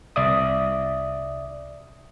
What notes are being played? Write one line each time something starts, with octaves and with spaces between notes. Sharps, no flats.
C2 D5 E5 D#6